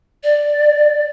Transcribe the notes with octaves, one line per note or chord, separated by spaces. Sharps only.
D5